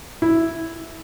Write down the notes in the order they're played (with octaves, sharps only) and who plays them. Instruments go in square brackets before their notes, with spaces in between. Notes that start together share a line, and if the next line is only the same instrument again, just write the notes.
[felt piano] E4